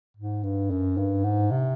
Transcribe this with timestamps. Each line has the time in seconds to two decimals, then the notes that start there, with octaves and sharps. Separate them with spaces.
0.17 G#2
0.43 G2
0.71 F#2
0.97 G2
1.24 G#2
1.51 C3